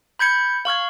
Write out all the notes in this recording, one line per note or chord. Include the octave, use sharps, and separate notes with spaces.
B5 G6 G#6 C#7
F5 C#6 F6 G#6